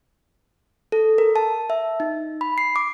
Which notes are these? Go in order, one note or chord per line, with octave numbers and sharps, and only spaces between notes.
A4
A#4
A5
E5
D#4
B5
C7
D6